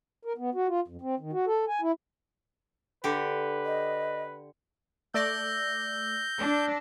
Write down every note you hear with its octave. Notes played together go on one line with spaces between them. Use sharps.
A#4
B3
F#4
F4
F2
C4
D#3
F#4
A4
G#5
E4
D3 G4 B4
D#5
A3 D5 E6 G6 A#6
D4